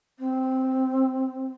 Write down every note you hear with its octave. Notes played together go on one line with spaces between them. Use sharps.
C4